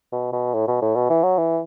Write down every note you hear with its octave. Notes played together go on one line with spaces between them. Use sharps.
B2
B2
A2
B2
A2
B2
E3
F#3
E3